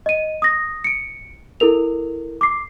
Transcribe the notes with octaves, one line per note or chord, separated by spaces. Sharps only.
D#5 D#7
D#6 A#6
C#7 D7
E4 A4 A#4 F7
D6 C7